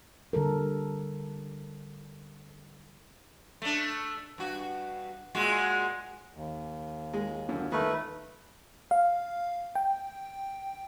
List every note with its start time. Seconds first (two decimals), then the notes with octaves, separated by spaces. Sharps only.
0.33 D3 G3 A4 A#4
3.62 A3 D4
4.38 G2 F#4
5.35 A#2 G#3 F#4
6.35 D#2
7.14 G#3
7.49 F#2 D3
7.72 D#3 A3 B4 C#6 F6
8.91 F5
9.75 G5